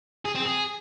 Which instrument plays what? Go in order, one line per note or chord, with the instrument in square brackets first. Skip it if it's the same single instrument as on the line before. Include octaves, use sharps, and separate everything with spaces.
[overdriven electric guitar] G#4
C4
G#4